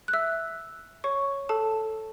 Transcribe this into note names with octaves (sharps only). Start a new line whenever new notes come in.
F#6
E5 E6
C#5 C#6
A4 A5